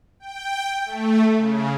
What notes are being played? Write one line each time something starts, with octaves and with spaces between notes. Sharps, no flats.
G5
A3
C#3